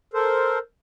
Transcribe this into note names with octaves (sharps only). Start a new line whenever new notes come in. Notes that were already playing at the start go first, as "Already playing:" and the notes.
A4 A#4 C5